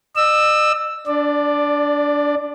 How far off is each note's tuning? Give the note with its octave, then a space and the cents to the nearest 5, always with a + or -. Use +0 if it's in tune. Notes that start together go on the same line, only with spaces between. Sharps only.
D#5 -45 E6 +0
D4 -15 D5 +15